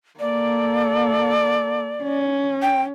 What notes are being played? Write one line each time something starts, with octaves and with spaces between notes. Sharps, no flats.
A#3 A4 D5
C#4
G5